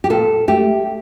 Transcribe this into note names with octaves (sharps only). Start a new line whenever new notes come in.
G4
A#2 A4
A3 G4